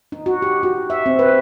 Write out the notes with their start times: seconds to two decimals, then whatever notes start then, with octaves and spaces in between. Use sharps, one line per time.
0.12 D#4
0.26 F#4
0.42 G4
0.63 F#4
0.90 E5
1.06 C4
1.19 B4